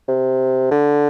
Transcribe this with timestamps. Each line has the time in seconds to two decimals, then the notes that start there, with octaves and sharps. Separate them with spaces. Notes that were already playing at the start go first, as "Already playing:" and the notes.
0.08 C3
0.71 D3